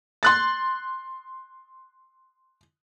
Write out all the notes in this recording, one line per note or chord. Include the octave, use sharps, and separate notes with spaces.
C6 F#6 A6